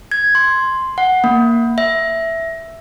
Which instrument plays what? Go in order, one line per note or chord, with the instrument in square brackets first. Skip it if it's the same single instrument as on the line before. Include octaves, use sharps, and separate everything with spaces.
[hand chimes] G#6
C6
F#5
A#3
E5